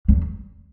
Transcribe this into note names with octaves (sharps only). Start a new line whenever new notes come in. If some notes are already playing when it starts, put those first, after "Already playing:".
E2